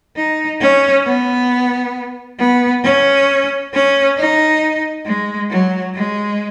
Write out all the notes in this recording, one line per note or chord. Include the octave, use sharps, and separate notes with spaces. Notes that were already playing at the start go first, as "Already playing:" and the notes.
D#4
C#4
B3
B3
C#4
C#4
D#4
G#3
F#3
G#3